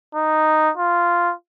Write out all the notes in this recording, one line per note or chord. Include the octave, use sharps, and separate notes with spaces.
D#4
F4